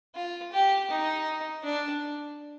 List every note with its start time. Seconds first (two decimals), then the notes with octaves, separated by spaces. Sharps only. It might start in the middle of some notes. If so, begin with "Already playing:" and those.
0.15 F4
0.52 G4
0.90 D#4
1.64 D4